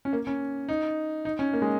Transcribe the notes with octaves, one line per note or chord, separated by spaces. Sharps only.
C#4
A#3
C#4
D#4
D#4
C#4
A#3
G#3